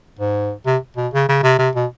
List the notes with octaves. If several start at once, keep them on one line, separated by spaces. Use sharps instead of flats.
G#2
C3
B2
C#3
C#3
C3
C3
B2